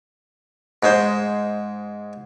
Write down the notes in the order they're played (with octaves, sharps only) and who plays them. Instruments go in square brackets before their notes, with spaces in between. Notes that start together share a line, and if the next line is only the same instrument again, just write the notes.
[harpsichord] G#2 G#3 C5